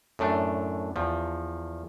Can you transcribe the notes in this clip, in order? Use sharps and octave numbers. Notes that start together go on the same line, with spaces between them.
F#2 A2 A3 D4
E2 F3